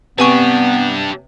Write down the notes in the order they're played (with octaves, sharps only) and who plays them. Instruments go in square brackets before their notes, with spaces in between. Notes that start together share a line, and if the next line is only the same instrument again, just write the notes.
[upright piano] C3 [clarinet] B3 [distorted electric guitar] D4 G4 [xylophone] B4 G#5 C#6